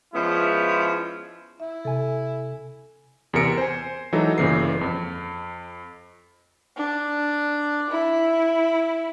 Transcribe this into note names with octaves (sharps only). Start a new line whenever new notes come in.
F3 G#3 B3 C#4 E4
E4 E5
C3 A4 G#5
E2 C3 A#4 C#7 D7
C5 G#5
E3 F#3 G#3 D#4 A4
G1 A#2 C#3 E3 C7
F2
D4
E4